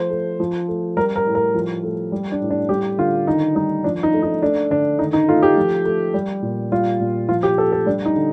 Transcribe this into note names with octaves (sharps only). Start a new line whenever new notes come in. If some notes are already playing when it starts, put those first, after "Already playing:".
Already playing: F3 A3 C5
A3
F3
A3
G3 A#4
A#4
A2
A#4
F3
A3
G3
D4
A2
D4
G3 G4
D3 F4
D#3 D#4
G3 D#4
F3 D4
D#4
A3
D#4
A3 D4
D3 D4
D#3 D#4
D#4
A3 F4
G4
F3
A3
G3
A#2
G3 F4
A#2
F3 F4
G4
A3 A4
A4
G3 D4
D#4
D3